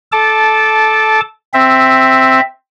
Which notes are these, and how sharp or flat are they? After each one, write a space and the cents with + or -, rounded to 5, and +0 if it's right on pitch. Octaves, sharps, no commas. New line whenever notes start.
A4 -15 A5 -10 D6 +5
C4 +0 E5 +0